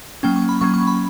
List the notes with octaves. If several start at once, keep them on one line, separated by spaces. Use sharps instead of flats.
F#3 A#3 C#4 G5
C#6
B5
F#3 A#3 C#4 C#6
C#6
B5